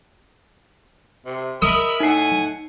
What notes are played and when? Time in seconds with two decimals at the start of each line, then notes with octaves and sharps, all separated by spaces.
1.26 C3
1.62 A#4 D#5 E5 B5 D#6
2.00 A2 D#4 E5 F#5 G#5 C7